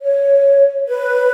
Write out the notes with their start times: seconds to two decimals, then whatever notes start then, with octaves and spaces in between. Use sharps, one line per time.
0.02 C#5
0.88 B4